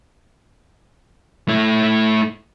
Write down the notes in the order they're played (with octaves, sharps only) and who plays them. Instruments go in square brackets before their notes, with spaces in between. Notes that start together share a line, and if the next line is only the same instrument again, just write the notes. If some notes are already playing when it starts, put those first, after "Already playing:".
[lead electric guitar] A3 E4